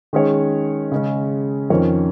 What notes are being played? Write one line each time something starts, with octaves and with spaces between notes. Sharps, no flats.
D#3 G#3 C#4 G#4 C#5
C#3 G#3 C#4
F2 D#3 C#4 A#4 C#5